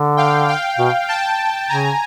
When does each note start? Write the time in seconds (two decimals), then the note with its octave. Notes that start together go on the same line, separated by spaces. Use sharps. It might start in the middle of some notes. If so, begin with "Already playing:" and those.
Already playing: D3
0.17 F5 G5
0.48 F5 G5
0.78 B2
1.08 G5 A5
1.69 C#3 G#5 A#5